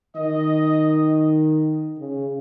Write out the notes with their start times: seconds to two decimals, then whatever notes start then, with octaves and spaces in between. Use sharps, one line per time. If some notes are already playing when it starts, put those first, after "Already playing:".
0.16 D#3 D#5
1.98 C#3